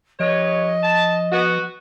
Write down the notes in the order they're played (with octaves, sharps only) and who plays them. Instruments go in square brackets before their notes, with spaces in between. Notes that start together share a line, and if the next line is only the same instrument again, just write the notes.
[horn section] G2 B4 C#5 [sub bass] F3 [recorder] D#5
[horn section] A5
B3 F#4